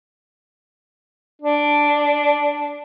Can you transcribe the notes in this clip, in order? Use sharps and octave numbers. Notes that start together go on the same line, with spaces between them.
D4